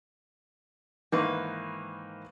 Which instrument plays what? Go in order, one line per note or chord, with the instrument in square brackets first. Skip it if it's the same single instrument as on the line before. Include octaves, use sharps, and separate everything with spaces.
[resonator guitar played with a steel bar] G#2 B4 [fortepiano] D#3 E3 A#3